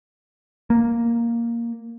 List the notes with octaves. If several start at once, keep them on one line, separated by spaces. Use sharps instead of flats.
A#3